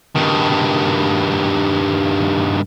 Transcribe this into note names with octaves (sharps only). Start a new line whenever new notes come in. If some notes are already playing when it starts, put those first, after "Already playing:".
G2 D#3